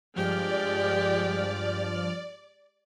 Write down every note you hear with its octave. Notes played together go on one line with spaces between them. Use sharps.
G2 F3 G#3 G4 D5 F6